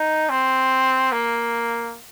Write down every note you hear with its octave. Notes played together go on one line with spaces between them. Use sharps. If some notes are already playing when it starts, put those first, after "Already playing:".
Already playing: D#4
C4
A#3